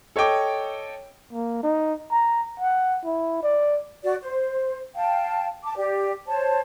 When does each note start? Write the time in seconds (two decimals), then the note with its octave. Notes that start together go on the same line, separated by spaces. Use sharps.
0.16 A4 C#5 D#5 G5 D6
1.33 A#3
1.63 D#4
2.11 A#5
2.60 F#5
3.05 E4
3.43 D5
4.03 F#4 D5
4.22 C5
4.95 F5 G5 A5
5.64 A5 D6
5.76 G4 D5
6.27 C5 C#5 A5